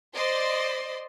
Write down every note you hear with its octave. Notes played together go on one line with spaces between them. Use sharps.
C5 D5 D#5 C6